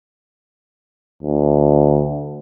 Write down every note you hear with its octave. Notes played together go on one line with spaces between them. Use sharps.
D2